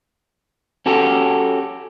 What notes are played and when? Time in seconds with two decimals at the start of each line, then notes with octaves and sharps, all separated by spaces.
0.86 C#4 F#4 G4 A4